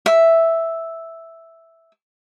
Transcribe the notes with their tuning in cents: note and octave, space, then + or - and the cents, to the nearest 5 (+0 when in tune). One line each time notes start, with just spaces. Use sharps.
E5 +0